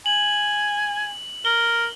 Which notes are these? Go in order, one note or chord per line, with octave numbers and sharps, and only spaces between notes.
G#5 F#7
A#4 G7